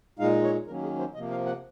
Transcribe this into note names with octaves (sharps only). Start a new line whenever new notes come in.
A#2 G#3 D#4 F5
C#5
D#3 F#3 A#3 C#4 A#4
G#4
C5
C3 F3 A#3 D#5
F5
F#5